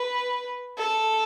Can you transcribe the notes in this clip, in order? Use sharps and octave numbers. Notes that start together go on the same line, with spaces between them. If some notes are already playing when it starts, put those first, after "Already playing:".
Already playing: B4
A4